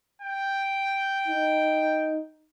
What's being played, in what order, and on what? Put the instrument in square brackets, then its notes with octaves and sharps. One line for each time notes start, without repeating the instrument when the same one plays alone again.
[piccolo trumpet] G5
[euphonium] D#4